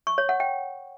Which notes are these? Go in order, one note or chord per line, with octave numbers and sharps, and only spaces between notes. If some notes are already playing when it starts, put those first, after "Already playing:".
C#6
C#5
F#5
G5